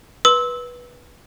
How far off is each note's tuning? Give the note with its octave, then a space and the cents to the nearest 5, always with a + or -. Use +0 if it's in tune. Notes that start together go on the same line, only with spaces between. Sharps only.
B4 -15 C6 +0 E6 -15